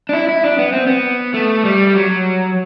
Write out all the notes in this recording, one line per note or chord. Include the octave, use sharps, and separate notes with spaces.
D4
E4
E4
D4
B3
C4
B3
A3
G3
F#3